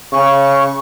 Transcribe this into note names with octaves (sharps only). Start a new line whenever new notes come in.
C#3 C#6